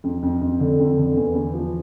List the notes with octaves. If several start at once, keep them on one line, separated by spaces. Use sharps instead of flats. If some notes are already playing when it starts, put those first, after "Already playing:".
F2
F2
F2
D3
F2
D3
E2
E2
F3